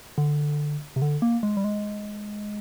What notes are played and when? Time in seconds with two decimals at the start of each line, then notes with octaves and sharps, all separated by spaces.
0.18 D3
0.96 C3
1.02 D3
1.22 A#3
1.43 G#3
1.57 G3
1.64 G#3